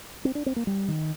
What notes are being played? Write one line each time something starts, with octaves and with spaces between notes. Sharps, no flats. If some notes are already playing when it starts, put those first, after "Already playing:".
C4
D4
C4
A#3
G3
D#3